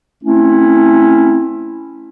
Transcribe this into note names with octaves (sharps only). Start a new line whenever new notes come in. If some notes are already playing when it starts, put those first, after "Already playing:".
A3 C4 C#4 E4